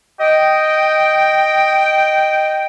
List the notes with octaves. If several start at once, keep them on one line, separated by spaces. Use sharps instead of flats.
D#5 G5